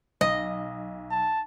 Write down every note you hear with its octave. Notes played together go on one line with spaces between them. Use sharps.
B1 D#5
A5